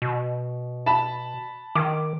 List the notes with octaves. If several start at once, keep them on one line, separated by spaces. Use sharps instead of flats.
B2
A5 B5 E7
D#3 D6